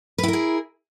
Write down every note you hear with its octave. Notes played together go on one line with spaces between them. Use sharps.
E4 G#4 A#4 B4